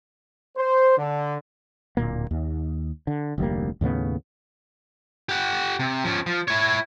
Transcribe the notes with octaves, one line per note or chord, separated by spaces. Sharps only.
C5
D3
D1 A#2 A#3
D#2
D3
F1 D2 G3 A#3
D#2 A2 C#3 B3
G4 F#5
C3
F3 C#4
F3
E4 C#5